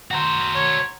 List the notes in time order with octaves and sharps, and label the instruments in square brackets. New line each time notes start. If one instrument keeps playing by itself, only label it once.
[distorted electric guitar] F#4 C5 [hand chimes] F#5 A#5 C6
[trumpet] C#5